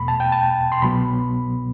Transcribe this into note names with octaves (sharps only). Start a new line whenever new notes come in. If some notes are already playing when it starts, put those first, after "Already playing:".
Already playing: E2 B2 A3 B5
A5
G5
A5
C6
C2 B2 F#3 B3 B5